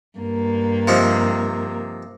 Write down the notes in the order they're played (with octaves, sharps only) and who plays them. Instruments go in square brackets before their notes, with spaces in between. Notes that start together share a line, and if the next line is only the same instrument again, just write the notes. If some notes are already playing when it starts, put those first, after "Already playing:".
[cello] G2 A#3
[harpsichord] C3 F3 D#4